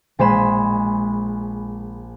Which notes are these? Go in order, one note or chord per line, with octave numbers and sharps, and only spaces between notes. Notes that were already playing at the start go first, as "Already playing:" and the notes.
A#1 G#3 C5 G#5 B5 E7